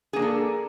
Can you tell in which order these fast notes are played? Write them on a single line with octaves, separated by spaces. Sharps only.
G#4 A#3 D4 A4